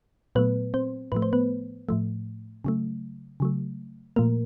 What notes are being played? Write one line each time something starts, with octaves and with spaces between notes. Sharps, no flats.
A#2 F#3 A3 B3 B4
C4 C5
A2 F3 A3 B4
C5
B3 B4
A2 F3 A3
C#3 F#3 A3
C#3 F#3 A3
A#2 F3 A3 A#3 A#4